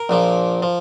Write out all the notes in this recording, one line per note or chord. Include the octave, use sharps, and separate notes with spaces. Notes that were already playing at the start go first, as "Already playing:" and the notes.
Already playing: A#4
A#1 A#2 F3
F3